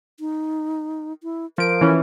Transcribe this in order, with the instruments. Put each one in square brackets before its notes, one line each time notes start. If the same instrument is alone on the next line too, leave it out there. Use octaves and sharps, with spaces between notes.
[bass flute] D#4
E4
[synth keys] F3 D7 [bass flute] A#4
[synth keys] E3 C#4